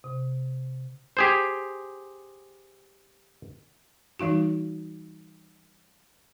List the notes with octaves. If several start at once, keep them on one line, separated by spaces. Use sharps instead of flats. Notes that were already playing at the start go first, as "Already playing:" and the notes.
C3
G4 G#4 C5
E3 G3 D#4 F#4